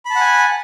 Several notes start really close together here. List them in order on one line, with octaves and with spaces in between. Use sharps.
B5 A5 F#5 G#5